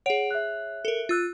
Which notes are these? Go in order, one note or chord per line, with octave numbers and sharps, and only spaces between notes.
G#4 C#5 F#5 D7
E5 F#6
A4 A#4
F4 E6 F#6